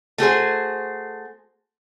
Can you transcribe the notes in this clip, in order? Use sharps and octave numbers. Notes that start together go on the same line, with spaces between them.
A3 F#4 G#4 C5